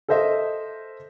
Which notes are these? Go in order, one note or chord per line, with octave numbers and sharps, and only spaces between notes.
A4 A#4 C5 D#5 E5